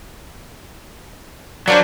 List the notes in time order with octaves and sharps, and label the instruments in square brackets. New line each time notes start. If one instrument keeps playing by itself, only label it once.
[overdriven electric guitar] F#3 [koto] A#3 D4 C5 [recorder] D5